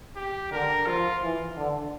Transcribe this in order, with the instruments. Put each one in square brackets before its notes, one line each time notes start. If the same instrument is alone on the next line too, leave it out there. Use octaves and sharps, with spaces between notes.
[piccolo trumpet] G4
[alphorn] D3 [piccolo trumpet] A#4
[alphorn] F3 [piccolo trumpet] F4
[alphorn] E3
D3